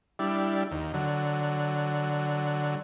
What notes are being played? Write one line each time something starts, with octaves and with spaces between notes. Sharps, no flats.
G3 D4 E4
D#2
D3 F#3